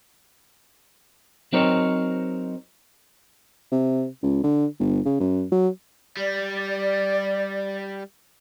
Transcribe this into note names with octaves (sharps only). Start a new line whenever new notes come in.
F#3 C4 D#4 A#4 C5 C#5
C3
C#2
D3
G1
C#3
F#2
F#3
G3 D5